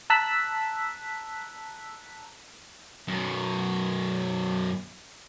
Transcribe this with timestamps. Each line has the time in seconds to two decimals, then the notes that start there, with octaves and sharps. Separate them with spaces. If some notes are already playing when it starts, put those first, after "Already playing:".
0.10 A5 A#5 E6 F#6 B6
3.08 F#2 B2